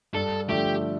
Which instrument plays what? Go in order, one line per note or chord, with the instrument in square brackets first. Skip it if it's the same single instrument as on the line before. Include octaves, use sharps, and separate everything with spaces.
[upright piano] G2 [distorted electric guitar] A4
[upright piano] D3 F3 A3 [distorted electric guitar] G4